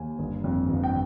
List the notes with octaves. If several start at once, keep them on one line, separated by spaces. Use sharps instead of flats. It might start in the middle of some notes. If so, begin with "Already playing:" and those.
Already playing: D#2 G#5
G1
F2
G1
G5